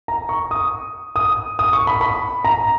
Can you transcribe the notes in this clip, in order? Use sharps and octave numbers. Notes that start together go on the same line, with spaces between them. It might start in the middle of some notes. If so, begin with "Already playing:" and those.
A#5
C#6
D#6
D#6
D#6
C#6
B5
B5
A#5